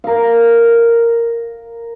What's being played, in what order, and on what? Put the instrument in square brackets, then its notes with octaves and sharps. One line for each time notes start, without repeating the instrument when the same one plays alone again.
[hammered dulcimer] A#4 F5